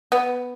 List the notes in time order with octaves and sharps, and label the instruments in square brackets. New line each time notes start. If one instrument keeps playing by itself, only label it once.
[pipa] B3